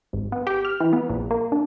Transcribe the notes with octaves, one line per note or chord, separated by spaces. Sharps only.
G#1
B3
G4
F6
E3
B3
A#1
A#3
D4